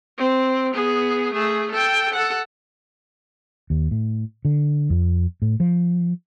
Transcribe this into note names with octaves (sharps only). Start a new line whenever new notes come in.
C4
B3 G#4
A3 G#4
A4 G5
A4 F#5
D#2
A2
D3
F2
A2
F3